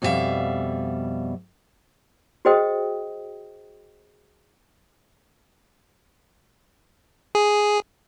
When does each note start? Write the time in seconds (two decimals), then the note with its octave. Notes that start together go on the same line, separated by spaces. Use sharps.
0.02 F2 B2 G3 E4 E5 F5
2.45 F#4 G#4 C5 D#5 G5 D#6
7.35 G#4